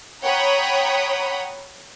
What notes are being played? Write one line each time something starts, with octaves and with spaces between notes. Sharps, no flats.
C#5 F#5 G5 A#5 B5 D#6